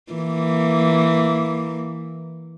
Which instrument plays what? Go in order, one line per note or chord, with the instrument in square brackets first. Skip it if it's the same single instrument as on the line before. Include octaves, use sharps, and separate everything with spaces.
[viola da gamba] E3 A#3